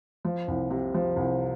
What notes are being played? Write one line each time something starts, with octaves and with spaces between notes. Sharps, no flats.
F3
C2
C3
F3
C2